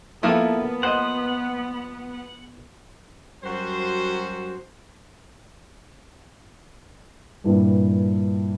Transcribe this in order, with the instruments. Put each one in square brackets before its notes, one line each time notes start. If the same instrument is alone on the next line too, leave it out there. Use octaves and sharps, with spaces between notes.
[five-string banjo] F3 A#3 F4 [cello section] B3 [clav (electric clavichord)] E4 A4 F5
[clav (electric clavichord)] C5 D#5 [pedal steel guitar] F#5
[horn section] F#2 G3 F#4 C5
[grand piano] G2 A#2 E3